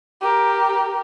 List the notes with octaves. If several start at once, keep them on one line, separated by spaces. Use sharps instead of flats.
G4 A#4